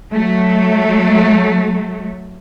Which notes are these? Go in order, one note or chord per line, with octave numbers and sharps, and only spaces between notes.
F#3 A3